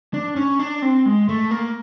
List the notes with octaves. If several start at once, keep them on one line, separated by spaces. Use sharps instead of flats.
D4
C#4
D4
C4
G#3
A3
A#3